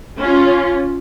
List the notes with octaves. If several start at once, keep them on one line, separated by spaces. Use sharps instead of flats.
C#4 F4